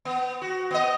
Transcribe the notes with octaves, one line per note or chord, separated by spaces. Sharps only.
B3
F#4
B3 D#5